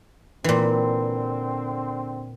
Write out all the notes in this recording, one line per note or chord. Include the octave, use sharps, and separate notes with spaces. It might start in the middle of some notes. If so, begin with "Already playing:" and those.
A#2 D3 E3 C4